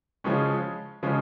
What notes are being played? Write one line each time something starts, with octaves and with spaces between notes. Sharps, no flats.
C#3 F3 G#3 C#4
C#3 F3 G#3 C#4